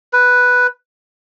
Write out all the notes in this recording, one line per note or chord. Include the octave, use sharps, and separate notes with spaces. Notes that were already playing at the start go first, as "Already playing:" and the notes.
B4